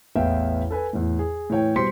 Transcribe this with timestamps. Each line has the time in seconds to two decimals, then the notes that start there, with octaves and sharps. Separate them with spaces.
0.15 A1 E2 B3 E5 F5 G5
0.70 A4 B4 G#5
0.93 E2 A2
1.19 G#4
1.50 A2 E3 C#5 G5
1.76 B2 G3 C5 C6 B6 C#7